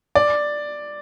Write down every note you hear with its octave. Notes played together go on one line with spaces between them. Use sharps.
D5